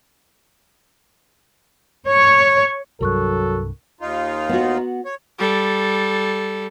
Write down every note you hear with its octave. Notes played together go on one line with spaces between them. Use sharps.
C#5
C2 G2 F#3 A4 A#4 C#6 F#6
D#2 D#4 F4
B3 F#4
C#5
G3 A4